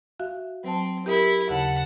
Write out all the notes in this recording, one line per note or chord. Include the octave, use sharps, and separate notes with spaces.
F#4 E5 F5
F#3 C4 A5
E4 G4 A#4 D#6
D#2 C#3 F#5 A5